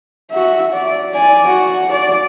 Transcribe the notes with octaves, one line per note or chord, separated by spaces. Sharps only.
F#4 E5
D5
D5 G#5
F#4
D5